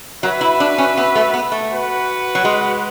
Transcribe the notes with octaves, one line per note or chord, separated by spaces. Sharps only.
F#3 F#4 B4 E5
E4
D4
C#4
B3
A3
B3
A3
F#4 B4 F#5
F#3
G#3